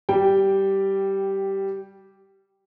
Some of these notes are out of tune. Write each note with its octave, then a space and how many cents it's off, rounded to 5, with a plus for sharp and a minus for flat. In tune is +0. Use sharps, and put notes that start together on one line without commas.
G3 -10 G5 +0